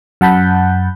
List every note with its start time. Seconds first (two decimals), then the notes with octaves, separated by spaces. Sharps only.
0.21 F#2 F#5 A5 B5 G6